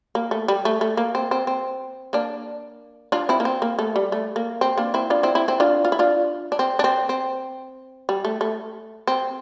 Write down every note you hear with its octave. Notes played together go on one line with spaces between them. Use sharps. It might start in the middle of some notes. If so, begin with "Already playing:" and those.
A#3
A3
G3
A3
A3
A#3
C4
C4
C4
A#3 D4
D4 F4
C4 E4
A#3
C4
A#3
A3
G3
A3
A#3
C4
A#3 D4
C4 E4
D4 F4
C4 E4
C4 E4
C4 E4
D4 F4
F4
E4
D4 F4
D4
C4
D4
C4
C4
G3
A3
A3
C4